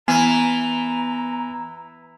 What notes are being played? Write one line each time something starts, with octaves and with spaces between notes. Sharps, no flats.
E3 B3 G#5 A#5